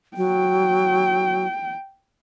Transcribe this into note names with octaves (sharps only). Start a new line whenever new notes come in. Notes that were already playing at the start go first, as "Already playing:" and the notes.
F#3 G5